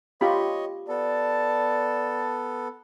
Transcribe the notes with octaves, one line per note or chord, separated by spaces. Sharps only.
F4 G4 C#5 D#5 B5
B3 A4 D5 A5